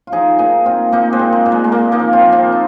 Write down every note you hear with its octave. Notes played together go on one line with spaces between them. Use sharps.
F4
F3 D#4 G#4
A#2 D#4 G#4
A#2 C4 F4
A#2 A#3 D#4
G#3 C4
A#2
G#3
A#2
G#3
G#3
A#2 A#3
A#3 D#4
F3
C4 F4
F3
C4 F4
D#4